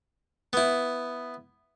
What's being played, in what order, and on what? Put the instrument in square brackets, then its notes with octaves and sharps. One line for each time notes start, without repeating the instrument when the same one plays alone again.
[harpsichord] B3 E4